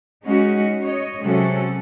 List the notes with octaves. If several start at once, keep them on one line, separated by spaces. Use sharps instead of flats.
G#3 C#4 D#4 F#4
C#5 D#5
C3 F#3 G#3 C#4 F#4 A4